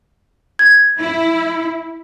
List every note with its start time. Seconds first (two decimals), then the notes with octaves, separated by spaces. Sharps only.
0.59 G#6
0.99 E4